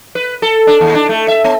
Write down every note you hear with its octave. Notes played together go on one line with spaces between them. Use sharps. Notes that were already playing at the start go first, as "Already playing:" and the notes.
B4
A4
D4
D#2
D4
A3
E5
B3